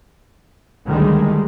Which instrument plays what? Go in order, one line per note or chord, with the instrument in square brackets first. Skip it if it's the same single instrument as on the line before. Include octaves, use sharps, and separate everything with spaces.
[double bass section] D2 D#3 G3 G#3